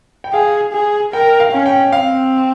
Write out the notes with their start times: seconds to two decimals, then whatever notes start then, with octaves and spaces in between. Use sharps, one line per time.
0.24 G5
0.33 G#4 F5
0.73 G#4
1.13 A#4 G5
1.40 F5
1.52 C#4
1.66 G5
1.92 C4 F5